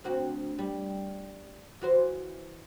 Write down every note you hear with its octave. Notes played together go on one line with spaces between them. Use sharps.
D2 C4 F#4
G3
E3 F#4 C5